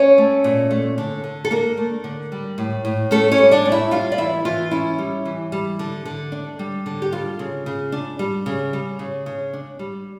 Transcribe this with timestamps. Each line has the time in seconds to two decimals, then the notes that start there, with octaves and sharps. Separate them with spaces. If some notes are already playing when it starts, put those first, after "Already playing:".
Already playing: C#4 C#5
0.18 A3
0.44 A#2
0.71 A3
0.98 D3
1.24 D3
1.45 A4
1.51 A#3 D4 A#4
1.77 A3
2.04 D3
2.32 G3
2.58 A2
2.85 A2
3.11 A3 C#4 A4
3.32 C#4 C#5
3.38 G3
3.51 D4 D5
3.65 A2
3.72 E4 E5
3.91 G3 F4 F5
4.12 D5
4.18 E3 E4 E5
4.45 E3 F4
4.71 C#4 E4
4.98 G3
5.25 E3
5.52 G3
5.79 D3
6.05 D3
6.32 D4
6.59 G3
6.86 D3
7.02 G4
7.12 G3 F4
7.39 C#3
7.66 C#3
7.92 D4
8.19 G3
8.46 C#3
8.73 G3
8.99 C#3
9.26 C#3
9.53 D4
9.79 G3